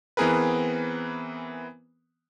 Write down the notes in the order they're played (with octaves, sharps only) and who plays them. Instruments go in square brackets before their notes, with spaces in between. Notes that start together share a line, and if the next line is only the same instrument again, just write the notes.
[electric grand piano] E3 B3 C4 G#4 A#4 B4